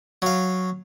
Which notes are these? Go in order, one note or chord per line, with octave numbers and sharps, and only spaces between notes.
F#3 F5